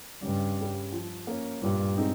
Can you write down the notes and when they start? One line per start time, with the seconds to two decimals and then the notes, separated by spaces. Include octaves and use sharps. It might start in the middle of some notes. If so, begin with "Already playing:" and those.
0.22 G2 C#3
0.58 G3 C#4
0.92 F3
1.27 A#3 C#4
1.62 G2 A#2
1.97 G#3 C4 D#4